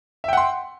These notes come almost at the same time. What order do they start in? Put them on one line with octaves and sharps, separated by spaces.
E5 G5 F#5 C6